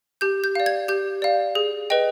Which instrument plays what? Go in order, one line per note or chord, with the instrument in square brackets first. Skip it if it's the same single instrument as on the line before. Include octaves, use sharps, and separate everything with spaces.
[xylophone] G4 G6
G6
D5 F5
G#6
G4 G6
D5 F5
G#4
B4 D#5 G5